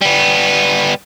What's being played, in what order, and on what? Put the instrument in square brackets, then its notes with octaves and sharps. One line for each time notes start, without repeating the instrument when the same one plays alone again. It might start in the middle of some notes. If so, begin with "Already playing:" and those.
[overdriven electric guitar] G3 B3